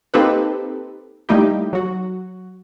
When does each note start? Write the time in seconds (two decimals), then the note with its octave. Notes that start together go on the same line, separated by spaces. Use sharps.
0.14 A#3 C4 D#4 G4 A4 B4
1.29 G3 A3 A#3 D#4 E4 G4
1.73 F#3 F#4